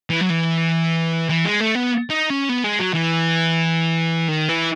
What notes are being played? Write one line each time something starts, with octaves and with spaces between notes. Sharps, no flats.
E3
F#3
E3
E3
G#3
A3
B3
D#4
C#4
B3
G#3
F#3
E3
D#3
E3